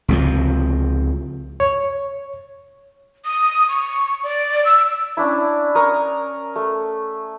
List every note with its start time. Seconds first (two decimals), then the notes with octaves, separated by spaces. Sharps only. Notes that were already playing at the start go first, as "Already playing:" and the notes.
0.08 C#2 C3 F3
1.60 C#5
3.25 D#6
3.68 C#6
4.24 D5
4.65 E6
5.17 C#4 D4 E4
5.75 A#4 C#6 D#6
6.56 A3